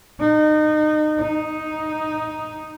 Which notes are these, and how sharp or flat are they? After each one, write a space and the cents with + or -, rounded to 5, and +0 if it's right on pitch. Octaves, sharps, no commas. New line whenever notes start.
D#4 -30
D#4 +0